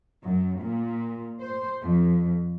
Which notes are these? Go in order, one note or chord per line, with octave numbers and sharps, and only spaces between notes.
F#2
A#2
C5
F2